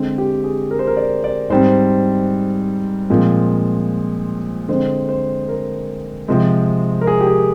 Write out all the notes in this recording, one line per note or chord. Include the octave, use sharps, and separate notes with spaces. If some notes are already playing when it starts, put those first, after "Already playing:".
Already playing: D3 G#3 C4
G4
G#4
A#4
C5
A#4
D5
D5
G#2 G3 C4 C5
A#2 F3 G#3 C4
D3 G#3 C4 C5
C5
A#4
C3 F3 G#3 C4
A#4
G#4
G4
G#4